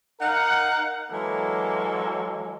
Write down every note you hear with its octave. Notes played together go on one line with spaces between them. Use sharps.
D#4 A#4 F5 F#5
E3 F#3 G#3 A#3 A4